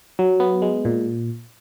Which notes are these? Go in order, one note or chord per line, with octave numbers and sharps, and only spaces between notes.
F#3
B3
G#3
A#2